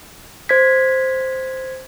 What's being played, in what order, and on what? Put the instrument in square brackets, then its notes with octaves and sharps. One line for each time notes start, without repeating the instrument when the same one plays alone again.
[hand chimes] C5 G#6 B6